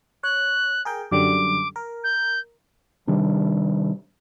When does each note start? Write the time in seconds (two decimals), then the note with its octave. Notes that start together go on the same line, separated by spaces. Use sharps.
0.23 C#5 F#6
0.85 G#4 A#4 G5
1.11 F#2 D3 G3 D6
1.76 A#4
2.04 G6
3.07 C3 D#3 G3 D4